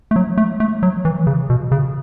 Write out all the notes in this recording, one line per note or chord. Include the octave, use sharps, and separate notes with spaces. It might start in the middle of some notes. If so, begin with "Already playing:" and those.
A3
F#3
A3
A3
F#3
E3
C#3
B2
C#3